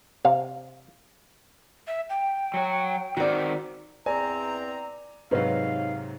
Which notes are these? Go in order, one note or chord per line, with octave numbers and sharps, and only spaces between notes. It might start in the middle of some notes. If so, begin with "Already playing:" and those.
C3 F5
E5
G5
F#3 C#5
D#3 C4 F#4 D5
E2 C4 D5 G#5 A#5
G#2 C3 F#3 D#4 B4 C#5 F5